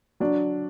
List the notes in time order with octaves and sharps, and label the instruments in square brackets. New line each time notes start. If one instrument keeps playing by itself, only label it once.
[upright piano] F#3 D4